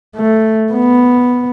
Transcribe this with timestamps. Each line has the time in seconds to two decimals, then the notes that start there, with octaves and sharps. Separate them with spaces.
0.16 A3
0.72 B3